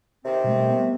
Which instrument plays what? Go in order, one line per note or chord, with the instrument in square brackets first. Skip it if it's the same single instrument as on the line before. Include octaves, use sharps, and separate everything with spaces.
[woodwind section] C3 D#3 C4
[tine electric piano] B2 G3 A3
B3